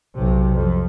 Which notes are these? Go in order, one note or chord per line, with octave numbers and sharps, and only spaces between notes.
B1 C3
F2